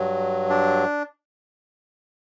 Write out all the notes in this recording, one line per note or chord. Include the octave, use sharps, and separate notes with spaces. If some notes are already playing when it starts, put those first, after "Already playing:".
Already playing: G2 F#3
D4